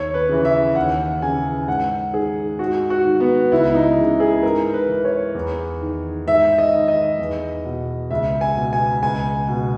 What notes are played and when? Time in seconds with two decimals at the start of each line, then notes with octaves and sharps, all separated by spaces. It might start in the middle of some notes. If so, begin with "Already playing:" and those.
Already playing: D#2 C#5
0.14 B4
0.29 C#3 E3
0.45 E5
0.75 D#2 F#5
1.22 C#3 E3 G#5
1.68 G#2 F#5
2.13 D#3 G#4
2.59 G#2 F#4
2.90 F#4
3.05 D#3
3.20 B3
3.52 C#2 E4
3.75 D#4
3.98 C#3 E3
4.20 G#4
4.43 G#2 A#4
4.74 B4
4.89 E3
5.05 C#5
5.35 E2
5.81 D#3
6.27 G#2 E5
6.58 D#5
6.74 D#3
6.88 D#5
7.19 E2
7.65 B2
8.11 C#2 E5
8.41 G#5
8.56 B2
8.73 G#5
9.02 C#2 G#5
9.48 B2